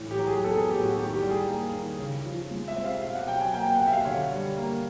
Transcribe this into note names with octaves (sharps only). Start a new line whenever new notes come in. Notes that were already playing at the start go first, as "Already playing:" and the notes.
Already playing: A2 E3
G4
F#3
G#4
B3 A4
G#4
A2 G4
F#4
D#3 G4
G4
G3
G#4
A#3
D#3
C#3
F3
G#3
E5
C4
F5
B2 F5
F#5
F#3 G5
G#5
A#3 G5
G5
F#5
B2 G5
E5
F5
D3 C#5
G3
A#3